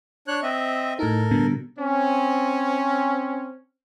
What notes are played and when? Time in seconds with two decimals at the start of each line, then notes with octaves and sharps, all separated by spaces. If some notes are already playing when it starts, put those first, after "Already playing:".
0.28 D4 C#5 F#6
0.43 C4 D#5 E5
0.99 A2 D#4 A4 A#4
1.31 B2 D3 G3
1.78 C4 C#4